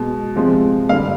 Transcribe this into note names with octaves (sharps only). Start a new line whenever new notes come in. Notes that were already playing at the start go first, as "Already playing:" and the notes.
Already playing: B2 G#3
C3 F3 G#3
G2 D3 G3 F5